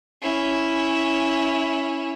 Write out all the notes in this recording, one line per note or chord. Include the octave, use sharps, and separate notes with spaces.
C#4 E4